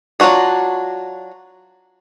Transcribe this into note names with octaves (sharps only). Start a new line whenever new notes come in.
F#3 D4 F4 F#4 G#4